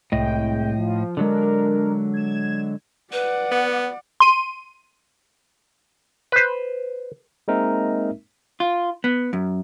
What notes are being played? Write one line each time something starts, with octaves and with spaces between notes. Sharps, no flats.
C2 A2 G#3 D#5 G5
F3
D3 F#3 G#3 D4 A#4
G#6 E7
B4 D5 F#5
B3
C6 D#7
B4 C5
G#3 A#3 C4 D#4 A#4 E5
F4
B3
F#2